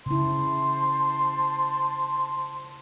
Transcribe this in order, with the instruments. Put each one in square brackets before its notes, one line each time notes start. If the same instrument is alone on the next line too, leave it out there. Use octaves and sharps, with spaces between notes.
[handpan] C#3 E4 [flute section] C5 A5 C6